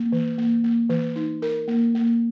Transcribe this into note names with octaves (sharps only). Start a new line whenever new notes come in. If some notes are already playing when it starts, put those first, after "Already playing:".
Already playing: A#3
E3
A#3
A#3
E3
D#4
A#4
A#3
A#3